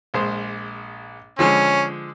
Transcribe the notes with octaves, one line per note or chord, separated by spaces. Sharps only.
A#1 G#3 C5
D3 F3 G#3 C#4